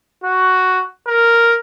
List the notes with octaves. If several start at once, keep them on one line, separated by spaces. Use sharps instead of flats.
F#4
A#4